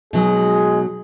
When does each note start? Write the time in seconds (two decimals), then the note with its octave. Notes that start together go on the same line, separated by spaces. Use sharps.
0.13 B2 F#3 G#3 D#4 G#4